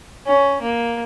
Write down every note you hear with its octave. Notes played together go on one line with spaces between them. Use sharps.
C#4
A#3